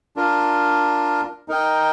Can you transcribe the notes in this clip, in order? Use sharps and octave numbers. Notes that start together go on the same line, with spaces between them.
D4 F4 A#4
D#4 A#4 D#5 G5